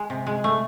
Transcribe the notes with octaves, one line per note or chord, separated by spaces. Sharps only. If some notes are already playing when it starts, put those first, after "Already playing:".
Already playing: G#3
C3
G#3
A3